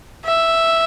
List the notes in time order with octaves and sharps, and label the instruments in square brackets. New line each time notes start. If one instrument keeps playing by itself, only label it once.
[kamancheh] E5